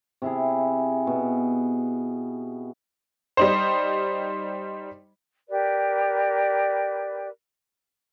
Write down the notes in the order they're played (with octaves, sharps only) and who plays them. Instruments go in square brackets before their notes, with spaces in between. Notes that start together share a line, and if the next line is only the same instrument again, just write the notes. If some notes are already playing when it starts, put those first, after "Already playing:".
[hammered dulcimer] C3 E4 G#4
B2
[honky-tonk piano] G3 D#4 C5
[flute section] G4 A#4 B4 D5